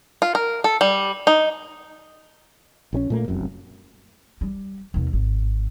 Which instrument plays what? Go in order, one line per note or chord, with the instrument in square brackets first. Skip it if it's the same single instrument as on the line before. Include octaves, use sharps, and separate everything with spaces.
[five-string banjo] F4
A#4
A4
G3
D#4
[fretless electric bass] A#1 D#3 C#4
A#2 A3 A#3
F1 C2 F#2
[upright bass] G3
D#2 B2
G#1